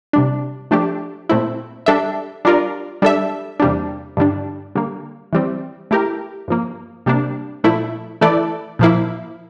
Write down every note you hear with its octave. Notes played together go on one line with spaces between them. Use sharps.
C3 G3 D4
F3 A3 D4 G4
A#2 A3 C4 E4
G3 D4 A4 E5
G3 D4 F4 A#4 D5
G3 D4 A4 E5
E2 C3 G3 A#3 D4
G2 D3 G3 D4
D3 G3 A#3
E3 G3 C4
A3 E4 G4 A#4
G2 F3 A#3
C3 G3 A#3 D4
A#2 F3 A3 E4
E3 A3 E4 A4 D5
A#2 F3 A#3 E4